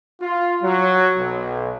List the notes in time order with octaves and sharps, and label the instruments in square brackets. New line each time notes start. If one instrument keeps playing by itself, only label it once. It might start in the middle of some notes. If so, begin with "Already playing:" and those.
[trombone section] F4
F#3
B1